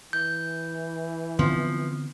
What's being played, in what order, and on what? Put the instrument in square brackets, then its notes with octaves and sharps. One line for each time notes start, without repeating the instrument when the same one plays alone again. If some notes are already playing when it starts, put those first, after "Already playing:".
[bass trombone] E3 [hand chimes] G6
[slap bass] D3 B3 C4 [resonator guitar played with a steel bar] F3